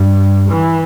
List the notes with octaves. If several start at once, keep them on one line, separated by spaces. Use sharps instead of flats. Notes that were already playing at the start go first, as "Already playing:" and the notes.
Already playing: G2
E3